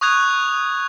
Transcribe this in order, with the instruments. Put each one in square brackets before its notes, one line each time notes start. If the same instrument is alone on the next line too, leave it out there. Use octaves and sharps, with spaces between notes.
[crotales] C#6 D#6 F#6 G#6 F7